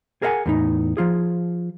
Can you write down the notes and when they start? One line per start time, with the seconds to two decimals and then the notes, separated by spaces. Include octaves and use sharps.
0.22 G#4 A#4 C5 F5 F#5 G#5
0.46 E2 A2 D#4
0.97 F3 F4 G#4